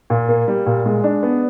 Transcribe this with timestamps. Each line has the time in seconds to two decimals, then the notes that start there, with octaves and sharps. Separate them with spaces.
0.10 A#2
0.29 A#3
0.48 G3
0.66 A#2
0.86 G#3
1.04 D4
1.23 B3